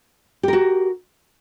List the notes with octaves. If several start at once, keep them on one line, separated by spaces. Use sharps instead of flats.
F#4 G4 A#4